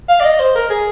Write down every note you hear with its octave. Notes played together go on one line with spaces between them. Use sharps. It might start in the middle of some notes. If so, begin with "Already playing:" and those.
F5
D5
D#5
C5
A#4
G#4